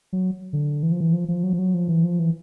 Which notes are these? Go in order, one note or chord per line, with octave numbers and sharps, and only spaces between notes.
F#3
D3
E3
F3
E3
F3
F3
F#3
F3
F#3
F3
E3
F3
E3